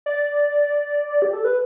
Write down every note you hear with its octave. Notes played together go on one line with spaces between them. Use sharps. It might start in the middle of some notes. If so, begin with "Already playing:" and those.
D5
G4
A4
B4